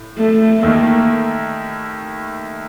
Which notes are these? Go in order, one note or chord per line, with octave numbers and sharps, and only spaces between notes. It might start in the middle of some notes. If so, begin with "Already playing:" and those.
Already playing: A2
A3
D#2 D#3 A3 A#3